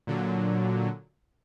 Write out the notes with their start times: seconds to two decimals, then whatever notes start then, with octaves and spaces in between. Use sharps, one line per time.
0.07 A#2 D3 F#3